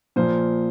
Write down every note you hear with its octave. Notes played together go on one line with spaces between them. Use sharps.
A#2 F3 C5